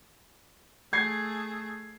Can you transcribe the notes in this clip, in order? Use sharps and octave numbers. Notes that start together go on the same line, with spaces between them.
A3 G#4 G#6 C7